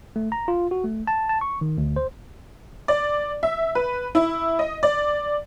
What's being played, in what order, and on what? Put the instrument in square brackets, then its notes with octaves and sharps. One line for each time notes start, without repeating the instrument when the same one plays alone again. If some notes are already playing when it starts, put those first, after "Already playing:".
[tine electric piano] A3
A#5
F4
F#4
A3
A5
A5
C#6
D#3
D2
C5
[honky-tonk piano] D5
E5
B4
E4
D#5
D5